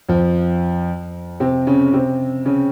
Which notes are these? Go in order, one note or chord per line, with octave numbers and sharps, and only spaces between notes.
F2 F3
C3 C4
C#3 C#4
C3 C4
C#3 C#4